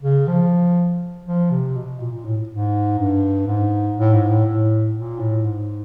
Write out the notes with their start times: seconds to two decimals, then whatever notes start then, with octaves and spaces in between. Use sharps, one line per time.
0.02 C#3
0.28 F3
1.26 F3
1.50 C3
1.75 B2
2.00 A#2
2.12 A#2
2.24 A2
2.49 G#2
2.98 G2
3.47 G#2
3.97 A2
4.14 G#2
4.29 A2
4.46 A2
4.95 A#2
5.19 A2
5.44 G#2